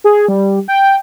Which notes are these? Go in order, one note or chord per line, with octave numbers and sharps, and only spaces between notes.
G#4
G3
G5